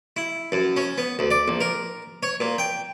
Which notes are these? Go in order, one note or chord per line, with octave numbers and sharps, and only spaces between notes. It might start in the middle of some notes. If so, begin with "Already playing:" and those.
E4
F#2
C#4
B3
D2
D5
A#1
A#4
C#5
A#2
G5